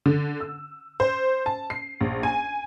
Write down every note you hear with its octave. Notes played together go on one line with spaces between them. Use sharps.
D3
E6
C5
A5
C7
A#1
G#5